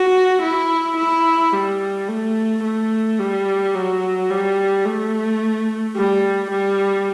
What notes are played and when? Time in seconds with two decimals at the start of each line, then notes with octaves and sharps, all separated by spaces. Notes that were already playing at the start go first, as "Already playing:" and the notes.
Already playing: F#4
0.42 E4
0.97 E4
1.52 G3
2.08 A3
2.63 A3
3.19 G3
3.74 F#3
4.30 G3
4.85 A3
5.96 G3
6.51 G3